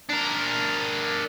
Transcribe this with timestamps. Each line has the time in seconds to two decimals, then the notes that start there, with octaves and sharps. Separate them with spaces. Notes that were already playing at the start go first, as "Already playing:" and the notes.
0.09 D4 A#4